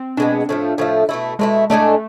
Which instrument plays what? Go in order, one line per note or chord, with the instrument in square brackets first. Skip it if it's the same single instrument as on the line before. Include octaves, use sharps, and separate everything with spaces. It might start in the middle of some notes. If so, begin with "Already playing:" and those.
Already playing: [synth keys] C4
[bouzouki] B2 G#3 B3 [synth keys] D4
[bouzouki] A2 F3 A3
A2 F3 A3
B2 A3 E4
[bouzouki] B2 A3 E4 [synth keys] G#3
[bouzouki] A2 G#3 D4 A4 [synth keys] A3